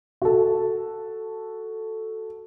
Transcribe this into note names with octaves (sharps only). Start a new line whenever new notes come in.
F#4 A4